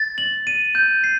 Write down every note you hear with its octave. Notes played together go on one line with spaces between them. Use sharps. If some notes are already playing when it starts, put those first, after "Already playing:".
Already playing: A6
F#7
D#7
G6
C7